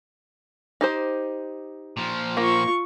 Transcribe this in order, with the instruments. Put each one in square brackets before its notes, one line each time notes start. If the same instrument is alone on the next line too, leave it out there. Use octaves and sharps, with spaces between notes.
[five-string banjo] D#4 G4 C5
[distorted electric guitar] A#2 F3
[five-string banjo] A#3 [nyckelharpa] F4 C#6